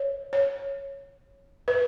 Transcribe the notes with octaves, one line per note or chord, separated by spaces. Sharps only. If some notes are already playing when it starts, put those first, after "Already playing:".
Already playing: C#5
C#5
B4